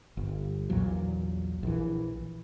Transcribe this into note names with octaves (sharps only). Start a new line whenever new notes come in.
G1
A#1 E2 A#2 F#3
A#1 E3